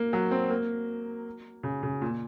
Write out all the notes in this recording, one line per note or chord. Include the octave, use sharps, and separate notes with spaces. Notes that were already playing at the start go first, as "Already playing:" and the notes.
Already playing: A#3
F#3
C4
A#3
C#3
C#3
A#2